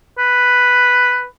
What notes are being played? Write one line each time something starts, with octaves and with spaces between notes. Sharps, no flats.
B4